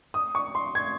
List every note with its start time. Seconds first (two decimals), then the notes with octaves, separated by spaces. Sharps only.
0.14 D#6
0.35 C#6
0.55 C6
0.75 G#6